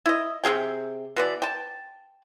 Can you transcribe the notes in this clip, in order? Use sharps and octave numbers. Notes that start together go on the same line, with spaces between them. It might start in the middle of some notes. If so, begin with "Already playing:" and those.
E4 D#5
C3 E4 G#4 G5
B2 E3 D5
G5 A5